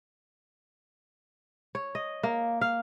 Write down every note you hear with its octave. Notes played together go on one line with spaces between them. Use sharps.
C#5
D#5
A#3
F5